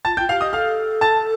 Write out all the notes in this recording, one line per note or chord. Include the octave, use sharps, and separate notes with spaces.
F4 A5 A6
F4 G5 G6
G4 F5 F6
D#5 D#6
A4 F5 F6
A5 A6